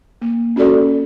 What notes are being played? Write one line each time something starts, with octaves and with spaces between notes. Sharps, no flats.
A#3
C#4 F#4 A4 D5